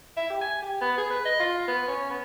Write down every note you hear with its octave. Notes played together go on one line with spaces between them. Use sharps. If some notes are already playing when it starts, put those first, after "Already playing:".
E5
G4
G#5
G4
B3
G#4
B4
D#5
F4
B3
C#4
B3